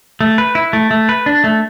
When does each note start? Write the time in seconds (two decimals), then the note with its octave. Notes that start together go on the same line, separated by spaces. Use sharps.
0.21 A3
0.38 B4
0.55 E4
0.73 A3
0.91 A3
1.09 B4
1.26 D4
1.44 A3